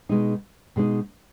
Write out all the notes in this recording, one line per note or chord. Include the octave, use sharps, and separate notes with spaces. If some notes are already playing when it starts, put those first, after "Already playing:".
B2 G#3 D#4
B2 G#3 D#4